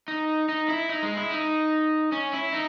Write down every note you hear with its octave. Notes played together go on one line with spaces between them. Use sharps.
D#4
D#4
E4
D#4
G#3
E4
D#4
C#4
E4
D#4